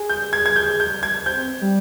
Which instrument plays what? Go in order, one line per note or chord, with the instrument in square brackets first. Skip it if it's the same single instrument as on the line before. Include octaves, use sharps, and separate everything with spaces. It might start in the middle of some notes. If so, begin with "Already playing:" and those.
Already playing: [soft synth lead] G#4
[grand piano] G6
G#6
G#6
G6
G6
G#6
[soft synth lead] C4 [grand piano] G6
[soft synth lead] G3